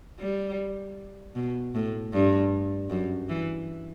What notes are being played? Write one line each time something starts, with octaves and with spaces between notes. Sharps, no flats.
G3
B2
A2
G2
F#2
E3